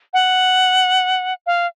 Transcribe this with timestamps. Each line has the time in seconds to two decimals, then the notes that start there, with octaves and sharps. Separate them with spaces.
0.14 F#5
1.47 F5